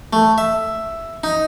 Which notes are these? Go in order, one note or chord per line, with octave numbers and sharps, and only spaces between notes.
A3
E5
D#4